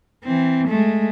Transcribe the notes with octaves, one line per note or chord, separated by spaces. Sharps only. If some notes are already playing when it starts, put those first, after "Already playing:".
E3 C4
G#3 A3